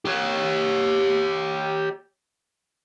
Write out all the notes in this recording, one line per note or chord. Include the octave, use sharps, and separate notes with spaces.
G4 C#5